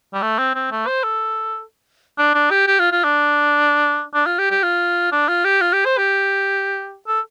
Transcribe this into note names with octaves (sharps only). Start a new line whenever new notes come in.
G3
A3
C4
C4
A3
C5
A4
D4
D4
G4
G4
F4
F4
D4
D4
F4
G4
G4
F4
D4
F4
G4
F4
G4
C5
G4
A4